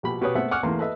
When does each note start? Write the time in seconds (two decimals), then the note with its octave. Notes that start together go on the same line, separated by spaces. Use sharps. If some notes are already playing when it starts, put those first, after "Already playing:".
0.03 A#1 B2 G4 B5
0.21 B2 G4 B4 C#5 D#6
0.35 A3 B3 C5 E5 F#5
0.51 F#5 G#5 C#6 D6 E6 F6
0.63 E2 E3 A3 A#3 C6
0.79 A4 B4 D#5 E5